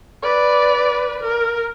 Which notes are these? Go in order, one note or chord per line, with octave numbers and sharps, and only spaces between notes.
B4 D5
A#4